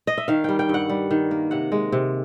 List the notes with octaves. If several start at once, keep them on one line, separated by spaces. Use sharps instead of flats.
D#5
E5
D#3 F5
G3 G5
G5
G2 F#5
G3
D#3
A#3
C3 F#5
G#3
C3